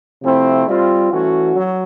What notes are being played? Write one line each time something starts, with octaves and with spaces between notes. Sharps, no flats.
C3 F3 A3 C4 E4
G3 C4 F4
E3 A3 C#4 F#4
F#3